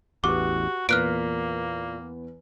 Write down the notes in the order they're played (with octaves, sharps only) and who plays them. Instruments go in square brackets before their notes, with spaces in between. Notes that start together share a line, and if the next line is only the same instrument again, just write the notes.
[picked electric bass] A1 E2 [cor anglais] F#4 [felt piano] G4 B4 [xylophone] D6
[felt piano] E2 B4 [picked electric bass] A#2 [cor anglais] A#3 [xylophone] F6 F#6 D7